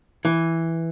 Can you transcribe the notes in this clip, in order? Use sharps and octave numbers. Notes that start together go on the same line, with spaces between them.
E3